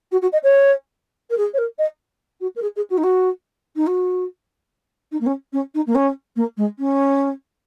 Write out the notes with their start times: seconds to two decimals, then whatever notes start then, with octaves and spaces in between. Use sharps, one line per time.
0.11 F#4
0.22 F#4
0.32 D#5
0.43 C#5
1.30 A#4
1.37 G#4
1.53 C#5
1.58 A#4
1.78 D#5
2.40 F#4
2.56 A#4
2.61 G#4
2.76 G#4
2.90 F#4
2.97 D#4
3.03 F#4
3.76 D#4
3.86 F#4
5.11 D#4
5.20 A#3
5.26 C#4
5.53 C#4
5.74 D#4
5.86 A#3
5.95 C#4
6.36 A#3
6.57 G#3
6.79 C#4